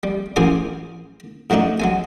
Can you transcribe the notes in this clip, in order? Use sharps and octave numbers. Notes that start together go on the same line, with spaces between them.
G3
A1 F#2 G#4 C5 G#5 D6
G#2 F#3 A3 D4 D#4
F#3 G#3 G#5